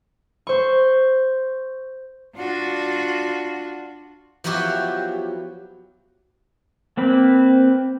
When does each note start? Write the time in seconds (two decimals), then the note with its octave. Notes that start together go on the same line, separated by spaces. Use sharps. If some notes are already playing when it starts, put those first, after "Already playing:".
0.47 C5 C#6
2.36 D4 F4 F#4
4.44 F3 F#3 B3 E4 F#4 G4
6.97 A#3 C4 B4